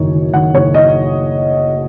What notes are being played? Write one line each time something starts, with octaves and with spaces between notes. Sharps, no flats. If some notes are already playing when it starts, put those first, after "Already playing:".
Already playing: F#1 F#2 D#3 C#5
D#3
D#3 F#5
F#1 C#5
D#5